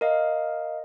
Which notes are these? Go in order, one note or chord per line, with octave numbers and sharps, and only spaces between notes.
A#4 D#5 F5